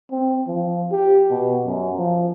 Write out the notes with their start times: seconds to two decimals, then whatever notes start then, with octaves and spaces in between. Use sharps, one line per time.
0.11 C4
0.48 F3
0.92 G4
1.31 B2
1.66 F#2
1.98 F3